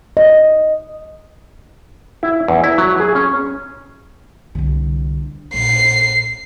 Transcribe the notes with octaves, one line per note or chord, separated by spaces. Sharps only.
D#5
E4
E2
E4
F#3
G#4
C#4
C2 D3
A#1 C7